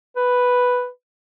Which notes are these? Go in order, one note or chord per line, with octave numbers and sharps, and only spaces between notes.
B4